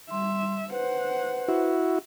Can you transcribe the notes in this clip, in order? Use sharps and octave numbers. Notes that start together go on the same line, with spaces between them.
G3 E5 C6
B4 C5 F#5
E4 F#4